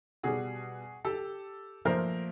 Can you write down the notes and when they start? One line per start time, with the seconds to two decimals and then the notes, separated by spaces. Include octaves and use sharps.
0.23 B2 G3 F#4 G#4
1.05 G4 A4
1.85 A#2 F3 A3 A#4 C5